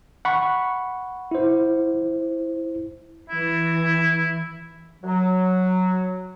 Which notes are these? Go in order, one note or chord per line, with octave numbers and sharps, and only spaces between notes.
F#5 B5 C#6
E4 C5
E3 E4
F#3